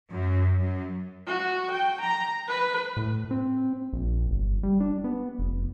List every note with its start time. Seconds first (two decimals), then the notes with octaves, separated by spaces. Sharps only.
0.11 F#2
0.60 F#2
1.27 F#4
1.71 G5
2.01 A#5
2.48 B4
2.97 A2
3.31 C4
3.93 A#1
4.30 G1
4.63 G3
4.80 D4
5.04 B3
5.39 F1